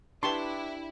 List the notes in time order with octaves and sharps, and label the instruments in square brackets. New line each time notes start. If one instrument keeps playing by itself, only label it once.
[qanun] D4 G4 B4 [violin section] E4 [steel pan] A5 C6 C#6